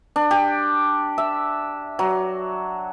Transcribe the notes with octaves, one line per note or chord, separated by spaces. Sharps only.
D4
G4
E5
F#3